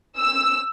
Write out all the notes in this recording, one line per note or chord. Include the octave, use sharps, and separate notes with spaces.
E6